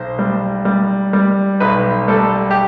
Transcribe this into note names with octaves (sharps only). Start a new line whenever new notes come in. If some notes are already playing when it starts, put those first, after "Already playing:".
Already playing: B1 C5
G3
G3
G3
B1 B4
G3 A4
G4